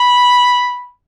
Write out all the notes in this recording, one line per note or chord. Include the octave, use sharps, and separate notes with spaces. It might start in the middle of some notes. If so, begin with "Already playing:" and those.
Already playing: B5